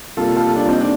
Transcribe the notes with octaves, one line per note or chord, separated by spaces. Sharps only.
C3 G3 A#3 F4 A4
F4 A4
D4 F4
C4 D#4
D4